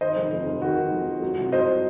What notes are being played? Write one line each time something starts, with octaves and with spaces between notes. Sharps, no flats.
D#3 C5 D#5
F1
F2
F1
D#3 F#4
D#3
F2
F2
F#3
C2
F#3 C5 D#5